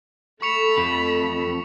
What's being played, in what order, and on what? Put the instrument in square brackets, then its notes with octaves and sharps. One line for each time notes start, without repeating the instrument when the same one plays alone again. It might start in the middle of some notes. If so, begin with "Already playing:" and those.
[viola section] A3 A4 [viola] B5 [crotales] C#6 C#7 F7
[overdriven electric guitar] F2